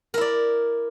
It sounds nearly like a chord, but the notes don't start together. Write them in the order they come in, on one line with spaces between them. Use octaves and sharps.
A#4 E4 D5